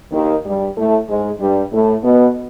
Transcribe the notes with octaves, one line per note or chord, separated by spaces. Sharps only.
D#2 D#3
G2 G3
A2 A3
G#2 G#3
G2 G3
A2 A3
B2 B3